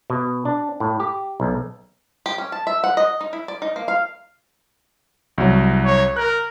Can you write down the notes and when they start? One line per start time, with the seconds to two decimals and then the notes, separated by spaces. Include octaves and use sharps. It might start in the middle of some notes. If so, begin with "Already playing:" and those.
0.10 B2
0.45 D4
0.80 A2
1.00 G4
1.40 B1
2.26 G4
2.38 C#4
2.52 A5
2.67 E5
2.84 F#5
2.97 D#5
3.21 D#4
3.33 E4
3.48 D5
3.62 D#4
3.76 A#3
3.88 F5
5.38 C2 F#3
5.85 C#5
6.16 A#4 F#6